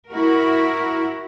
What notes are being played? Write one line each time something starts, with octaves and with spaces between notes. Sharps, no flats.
E4 F#4 A#4